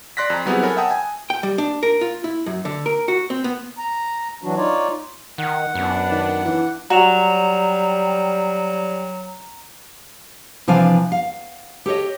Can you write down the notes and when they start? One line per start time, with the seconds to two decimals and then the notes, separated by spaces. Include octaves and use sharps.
0.17 D5 C6 F#6 A#6 B6
0.30 F2 A#5
0.45 F#3 G3 B3 C4 E4 G#4
0.63 A4 A#4 C#5 G#5 B5
0.77 E5 F#5 G5 A5 D#6
0.91 G#5
1.30 G5
1.43 G3
1.58 D4
1.83 A#4
2.01 F4
2.24 E4
2.46 F#2
2.65 D3
2.86 A#4
3.08 F#4
3.30 C4
3.44 B3
3.78 A#5
4.43 E3 F#3 D4 F#4
4.56 D#4 F4 C#5 D5
5.38 D#3 F#5
5.75 F#2 B3 D4
6.11 D#3
6.45 E3
6.90 F#3 G3 F#4 A#5 E7 F7
10.68 C3 E3 F3 D4 F5 G#5
11.12 F5
11.86 G4 A4 C#5 D#5